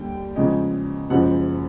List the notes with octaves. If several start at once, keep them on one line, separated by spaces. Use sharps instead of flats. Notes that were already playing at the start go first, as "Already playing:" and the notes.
Already playing: D#2 D3 G3 G5
E2 C#3 F3 G#3
F#1 F#2 C#3 F3 G#3 F#5